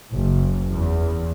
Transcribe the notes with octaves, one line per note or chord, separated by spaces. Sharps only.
F#1
E2